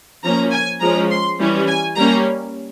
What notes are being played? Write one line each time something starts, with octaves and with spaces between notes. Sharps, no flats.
F3 A#3 C#4 A#5
G#5
F3 G#3 C#4 A#5
C6
E3 G3 C#4
G#5
G3 A#3 C#4 A#5